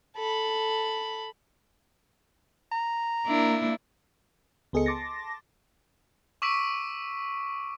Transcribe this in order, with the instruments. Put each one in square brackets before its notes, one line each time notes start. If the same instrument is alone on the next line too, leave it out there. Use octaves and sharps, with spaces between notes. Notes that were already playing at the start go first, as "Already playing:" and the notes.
[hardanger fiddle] A4 B5
[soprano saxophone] A#5
[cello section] A#3 [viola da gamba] D4 E4
[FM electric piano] C#2 B3 G#4 A4 D#5 C#7
A5 C6 D6 A6 A#6
[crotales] C#6 D6 E6 B6 D7 D#7